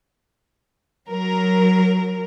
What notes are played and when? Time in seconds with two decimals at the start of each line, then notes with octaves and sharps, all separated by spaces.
1.07 F#3 A#4